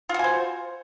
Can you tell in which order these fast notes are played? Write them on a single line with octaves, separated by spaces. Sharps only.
F4 F#4 G#5 C5